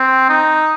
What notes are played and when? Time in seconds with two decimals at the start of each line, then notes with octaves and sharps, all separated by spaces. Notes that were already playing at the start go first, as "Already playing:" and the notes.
Already playing: C4
0.29 D#4